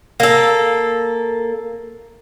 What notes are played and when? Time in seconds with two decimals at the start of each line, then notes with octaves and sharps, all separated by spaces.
0.20 A#3 A4